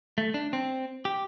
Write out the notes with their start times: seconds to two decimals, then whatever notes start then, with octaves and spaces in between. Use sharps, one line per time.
0.18 A3
0.34 D4
0.53 C4
1.05 G4